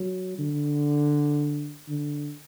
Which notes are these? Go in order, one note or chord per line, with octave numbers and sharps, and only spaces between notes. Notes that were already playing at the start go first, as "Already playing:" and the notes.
Already playing: F#3
D3
D3